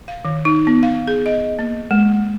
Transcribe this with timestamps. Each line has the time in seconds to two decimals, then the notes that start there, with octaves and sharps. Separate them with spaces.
0.08 F5
0.25 D#3
0.45 D#4
0.67 B3
0.83 F5
1.08 G#4
1.26 D#5
1.59 A#3
1.91 G#3